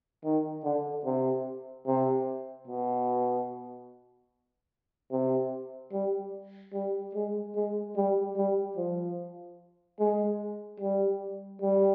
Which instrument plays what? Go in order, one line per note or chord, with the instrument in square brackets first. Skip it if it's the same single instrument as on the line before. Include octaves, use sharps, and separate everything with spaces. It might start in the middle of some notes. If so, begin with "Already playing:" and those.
[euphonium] D#3
D3
C3
C3
B2
C3
G3
G3
G#3
G#3
G3
G3
F3
G#3
G3
G3